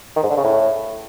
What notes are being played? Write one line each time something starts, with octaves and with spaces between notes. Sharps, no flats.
D#3
G#2
D3
C#3
A2